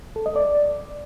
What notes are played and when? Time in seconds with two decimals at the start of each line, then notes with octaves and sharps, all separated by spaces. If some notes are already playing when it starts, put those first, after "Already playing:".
0.16 A4
0.26 D#5
0.36 D5